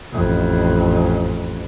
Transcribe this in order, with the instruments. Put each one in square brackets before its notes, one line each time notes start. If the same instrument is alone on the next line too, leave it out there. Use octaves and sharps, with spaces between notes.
[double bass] A1 F2